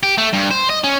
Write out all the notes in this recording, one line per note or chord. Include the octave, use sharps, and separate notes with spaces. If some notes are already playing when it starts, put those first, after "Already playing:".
G4
A3
G2
C5
D#5
C#4